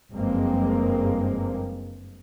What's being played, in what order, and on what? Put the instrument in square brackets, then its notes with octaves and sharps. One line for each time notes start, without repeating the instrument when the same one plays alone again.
[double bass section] F#1 G2 F3 G#3 A#3 C4